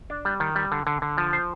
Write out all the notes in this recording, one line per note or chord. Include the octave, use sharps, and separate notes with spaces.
D4
G3
D#3
G3
D3
D3
D3
F3
C5